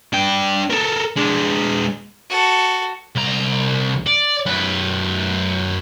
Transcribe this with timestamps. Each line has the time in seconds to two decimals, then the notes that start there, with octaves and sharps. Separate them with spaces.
0.13 D4 G5
0.70 A4 A#4
1.16 G#3 D4
2.29 F#4 A4
3.16 C2 A#5
4.07 D5
4.46 F#2 B4